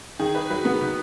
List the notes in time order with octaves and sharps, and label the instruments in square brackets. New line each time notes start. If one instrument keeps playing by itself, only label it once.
[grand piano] D#3 [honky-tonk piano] G#4
[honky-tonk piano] B4
[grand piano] F#3 [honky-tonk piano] B4
[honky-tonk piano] B3
D#3